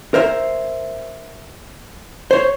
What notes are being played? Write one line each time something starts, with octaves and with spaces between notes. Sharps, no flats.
A#4 C5 E5
C5 C#5